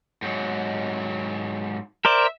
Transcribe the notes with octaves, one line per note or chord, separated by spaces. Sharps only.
G#2 F#3
A#4 C5 D5 E5